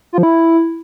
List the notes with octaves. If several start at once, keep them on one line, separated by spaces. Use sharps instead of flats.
F4
F3
E4